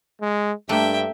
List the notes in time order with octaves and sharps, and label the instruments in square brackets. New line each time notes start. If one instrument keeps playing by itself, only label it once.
[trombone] G#3
[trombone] G2 [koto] A3 A#3 D4 [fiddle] E5 G5